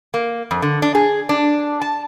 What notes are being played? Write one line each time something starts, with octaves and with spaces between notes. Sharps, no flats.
A#3
F2
D3
D4
G#4
D4
A5